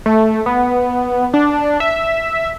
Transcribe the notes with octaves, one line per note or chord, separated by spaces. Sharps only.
A3
B3
D4
E5